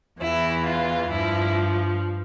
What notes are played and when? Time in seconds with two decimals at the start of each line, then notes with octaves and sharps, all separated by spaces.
0.20 E2 E3 E4
0.65 F4
1.10 G2 F3 E4